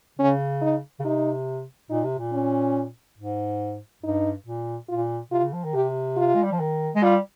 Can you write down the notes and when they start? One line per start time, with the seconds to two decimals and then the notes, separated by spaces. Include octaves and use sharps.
0.19 C#3 C#4
0.62 D#4
0.99 C#3
1.04 C3 D#4
1.90 A#2 D#4
2.04 C3
2.19 A#2
2.32 C#4
3.18 G#2
4.03 G2 D#4
4.46 A#2
4.89 A#2 F4
5.31 C3 F4
5.42 C#3
5.53 F3
5.64 D#3
5.74 C3 G4
6.17 F4
6.35 G#3
6.43 G3
6.52 F3
6.59 D#3
6.95 G#3
7.02 G3 F4